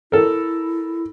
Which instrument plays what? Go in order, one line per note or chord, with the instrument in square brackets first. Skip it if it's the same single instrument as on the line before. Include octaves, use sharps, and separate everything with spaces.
[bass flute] E4 [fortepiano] A4 A#4